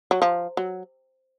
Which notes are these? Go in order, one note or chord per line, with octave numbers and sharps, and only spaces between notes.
F#3
F3
F#3